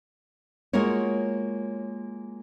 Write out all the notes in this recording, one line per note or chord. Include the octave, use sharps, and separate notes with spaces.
G#3 A#3 F4 F#4 A#4 C#5